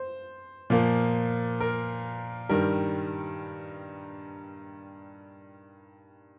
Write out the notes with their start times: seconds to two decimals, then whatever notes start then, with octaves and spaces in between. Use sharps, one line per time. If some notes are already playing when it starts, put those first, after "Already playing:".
Already playing: C5
0.70 A#2 F3 A#3
1.60 A#4
2.49 G2 D#3 G3 A#4